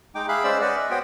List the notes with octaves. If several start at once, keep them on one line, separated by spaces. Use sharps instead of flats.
G#3 D#4 G5 D6
G#4 E5 F5 B5 F#6
G#3 C#4 C5 D5 E6
B4 D5 D#5 F#5
E5
B3 F#4 C5 C#5 G5